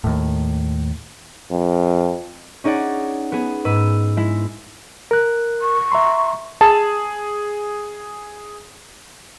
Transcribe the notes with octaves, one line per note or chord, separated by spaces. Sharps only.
D#2 A2
F2
C#4 D#4 G#4 D5 F#5
B3 G#4
G#2 B4 E6 D#7
G#3 E4
A#4 F#6
C#6
E5 A#5 C6
G#4 A5